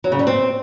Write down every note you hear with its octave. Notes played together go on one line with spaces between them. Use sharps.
F#3
C#3
G3
C4